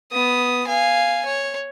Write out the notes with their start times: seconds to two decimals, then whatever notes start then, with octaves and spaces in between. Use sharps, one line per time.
0.12 B3 D#6
0.67 F5 G#5
1.26 C#5